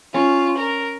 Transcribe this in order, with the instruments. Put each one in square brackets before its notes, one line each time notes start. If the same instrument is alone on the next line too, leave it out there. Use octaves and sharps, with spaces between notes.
[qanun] C#4 [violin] F4
[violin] A#4